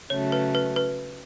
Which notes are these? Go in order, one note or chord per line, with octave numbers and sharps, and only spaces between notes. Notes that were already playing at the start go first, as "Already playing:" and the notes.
C#3 F#3 A3 C#5
B4
B4
B4